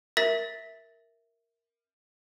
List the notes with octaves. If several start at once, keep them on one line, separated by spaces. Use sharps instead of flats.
A#4 E5 A#6 B6